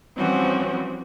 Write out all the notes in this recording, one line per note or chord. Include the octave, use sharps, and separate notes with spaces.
E3 F3 G3 C4 C#4 F#4